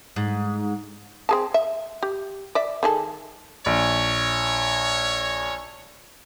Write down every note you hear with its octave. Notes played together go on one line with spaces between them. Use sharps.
G#2
C4 G#4 A5
E5
G4
D5 E5
D#3 G#4 A4
A#1 C#5